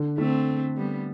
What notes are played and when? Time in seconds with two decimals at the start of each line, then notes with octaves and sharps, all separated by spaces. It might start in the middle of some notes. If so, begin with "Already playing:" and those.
Already playing: D3
0.18 D3 A3 C4
0.77 G3 B3